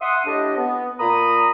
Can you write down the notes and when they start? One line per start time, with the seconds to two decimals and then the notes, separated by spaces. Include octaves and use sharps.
0.02 E5 F#5 C6 D#6
0.26 A2 D4 G4 D#5
0.57 B3
0.99 A#2 A#5 B5 D#6